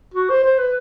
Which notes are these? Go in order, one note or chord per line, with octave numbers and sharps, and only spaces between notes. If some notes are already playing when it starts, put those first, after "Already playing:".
F#4
C5
C5
B4